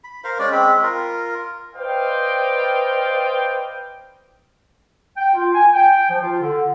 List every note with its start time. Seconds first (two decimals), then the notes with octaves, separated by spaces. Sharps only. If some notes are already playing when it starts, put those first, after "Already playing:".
0.04 B5
0.24 A#4 C5 F5
0.39 G#3 C#4 D5
0.52 G#3 C4 B5
0.83 F4 A#4
1.76 B4 C5 D5 D#5 F5 G5
5.17 G5
5.34 F4
5.55 G#5
5.74 G5
6.09 F3
6.22 F4
6.41 D3